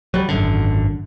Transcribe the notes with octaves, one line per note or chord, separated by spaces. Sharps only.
F#3 G3
G#1 F#2 D3